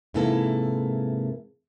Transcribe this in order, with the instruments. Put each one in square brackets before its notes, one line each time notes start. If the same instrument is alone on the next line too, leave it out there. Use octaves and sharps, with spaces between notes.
[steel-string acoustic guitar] G#2 C3 E3 A#3 E4 A4